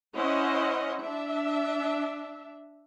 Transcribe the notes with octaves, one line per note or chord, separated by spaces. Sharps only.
C#4 E4 C5 D#5 F#5
D4 E5